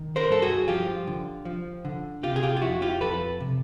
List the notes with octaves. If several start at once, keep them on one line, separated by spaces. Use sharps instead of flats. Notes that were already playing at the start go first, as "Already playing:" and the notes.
Already playing: D#3
A#4 C5
G2 A4
F#4 G#4
F3 F4 G4
D3
F3
D3
C3 F4 G4
G#4
F4 G4
F4
F2 E4 F#4
F4 G4
F2 A4 B4
C3